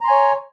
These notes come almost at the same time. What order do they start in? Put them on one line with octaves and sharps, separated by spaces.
A#5 C6 G#5 C#5